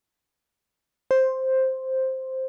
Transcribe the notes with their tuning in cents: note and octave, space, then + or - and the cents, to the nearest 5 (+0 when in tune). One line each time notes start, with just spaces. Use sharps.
C5 +5